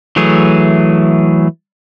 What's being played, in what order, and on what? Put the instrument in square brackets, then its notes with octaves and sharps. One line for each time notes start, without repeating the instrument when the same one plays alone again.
[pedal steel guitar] E3 F#3 A3 G#4